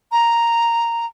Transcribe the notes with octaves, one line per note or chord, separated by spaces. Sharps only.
A#5